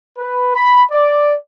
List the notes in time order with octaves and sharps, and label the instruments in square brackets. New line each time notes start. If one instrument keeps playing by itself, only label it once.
[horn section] B4
B5
D5